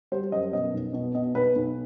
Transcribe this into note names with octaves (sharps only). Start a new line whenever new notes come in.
G3 C5
F#2 D#5
B2 D#5
B1
B2
B2 D#5
B1 B4
B1